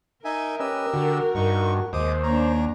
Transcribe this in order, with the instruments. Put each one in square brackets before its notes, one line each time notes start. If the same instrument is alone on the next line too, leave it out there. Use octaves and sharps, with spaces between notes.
[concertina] D#4 E5 G#5 [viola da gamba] A#4
[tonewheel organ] C#4 B4 D#5 [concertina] G4 E6
[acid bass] D3 [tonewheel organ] F#4
[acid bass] G2 [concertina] D#4 C#6
[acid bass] D#2 [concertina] G#3 D6 D#6 [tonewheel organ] C5
[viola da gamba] A#3 D4 [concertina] C#5 A#5